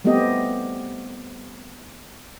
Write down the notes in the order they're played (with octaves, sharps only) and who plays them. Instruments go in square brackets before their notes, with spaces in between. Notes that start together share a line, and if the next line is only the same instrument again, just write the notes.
[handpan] G3 A3 B3 C4 G4 D#5